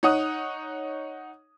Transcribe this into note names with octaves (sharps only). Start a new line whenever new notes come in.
D#4 C#5 F#5 D#6